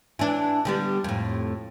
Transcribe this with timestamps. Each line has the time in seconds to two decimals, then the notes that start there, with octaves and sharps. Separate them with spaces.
0.19 E3 D4
0.65 D3 G3 B3
1.04 F2 A2